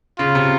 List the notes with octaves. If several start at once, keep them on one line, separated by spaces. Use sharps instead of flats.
C#3 F4
C3